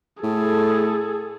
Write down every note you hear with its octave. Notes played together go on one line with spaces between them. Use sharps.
A2 G#4 A4